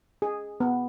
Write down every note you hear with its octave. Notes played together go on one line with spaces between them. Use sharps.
G#4
B3